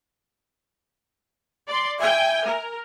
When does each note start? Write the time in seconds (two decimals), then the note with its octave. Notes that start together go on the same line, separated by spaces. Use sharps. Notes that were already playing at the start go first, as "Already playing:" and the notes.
1.67 D5 C6
2.00 E5 G5 G#5
2.45 A#4